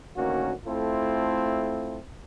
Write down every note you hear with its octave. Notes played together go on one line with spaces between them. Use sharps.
D2 D#3 A#3 C#4 F#4
A3 C4 E4 F4 A4